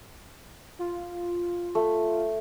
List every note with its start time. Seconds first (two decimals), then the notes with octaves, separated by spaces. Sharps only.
0.79 F4
1.75 A3